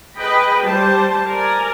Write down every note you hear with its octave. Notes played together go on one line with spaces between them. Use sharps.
G#4 B4 D#5 G5 B5
G3 G4 C5 A5
A#4 D5 G#5